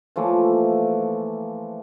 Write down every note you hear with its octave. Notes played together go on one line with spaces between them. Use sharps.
E3 F3 A3 A#3